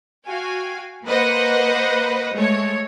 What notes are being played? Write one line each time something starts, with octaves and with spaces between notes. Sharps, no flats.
F#4 F5 G5 G#5
A#3 B4 C5 D#5 F#5
G#3 A3 C#5